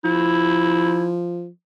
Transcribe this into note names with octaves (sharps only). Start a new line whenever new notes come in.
F3 E4